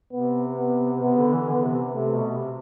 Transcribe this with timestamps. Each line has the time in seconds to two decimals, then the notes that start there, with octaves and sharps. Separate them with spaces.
0.12 C3 B3
0.57 B3
1.02 C3 B3
1.18 D3
1.34 E3
1.49 D3 B3
1.64 C3
1.94 C3 A3
2.16 B2
2.39 C3